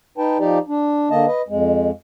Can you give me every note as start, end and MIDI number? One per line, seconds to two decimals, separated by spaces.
0.18 0.38 63
0.18 0.38 71
0.18 0.38 79
0.18 0.38 81
0.39 0.58 53
0.39 0.58 63
0.39 0.58 67
0.39 0.58 74
0.68 1.09 62
1.11 1.26 50
1.11 1.26 58
1.11 1.26 75
1.11 1.26 81
1.27 1.42 71
1.27 1.42 75
1.49 1.91 41
1.49 1.91 56